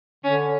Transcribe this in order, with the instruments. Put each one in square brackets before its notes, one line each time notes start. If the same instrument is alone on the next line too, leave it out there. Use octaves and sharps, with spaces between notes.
[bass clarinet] D3 [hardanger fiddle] C#4